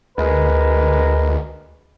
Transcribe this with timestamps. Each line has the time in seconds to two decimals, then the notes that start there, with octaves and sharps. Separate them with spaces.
0.18 D2 G#3 A#4 B4